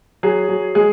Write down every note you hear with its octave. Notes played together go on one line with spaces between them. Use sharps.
F#3 G#4
F#3
G#3 G#4